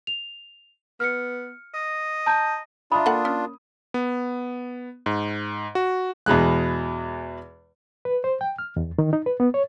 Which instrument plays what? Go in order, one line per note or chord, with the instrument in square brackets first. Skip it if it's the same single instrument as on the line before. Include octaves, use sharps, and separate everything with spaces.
[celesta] F7
[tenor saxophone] B3 [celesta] F6 C#7
[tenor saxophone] D#5
[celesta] A5 A#5 G6
[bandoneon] D4 F4 [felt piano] E5 A#5 D#6 [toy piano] B5
[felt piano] A#3 [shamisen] A4 F#5
[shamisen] C#4
[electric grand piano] B3
G#2
F#4
[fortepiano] E2 B2 G#3 F#6
[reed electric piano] B4
C5
G5
F6
E2
D#3
D#4
B4
B3
C#5